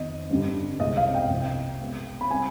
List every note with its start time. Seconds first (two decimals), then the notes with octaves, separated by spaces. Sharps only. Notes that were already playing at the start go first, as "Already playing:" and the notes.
Already playing: F2 D#3 B3 D#5
0.30 G2 D3 G3
0.80 C2 B2 G#3 D#5
0.97 F5
1.14 G5
1.30 C2 C3 F3
1.80 B2 G#3 B3
2.21 B5
2.30 C3 G3 C4 G#5